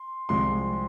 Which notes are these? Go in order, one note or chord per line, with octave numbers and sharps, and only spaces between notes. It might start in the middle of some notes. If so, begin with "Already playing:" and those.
Already playing: C6
C2 C3 F3 G#3 C6